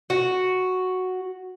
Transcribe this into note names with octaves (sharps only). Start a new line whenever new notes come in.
F#4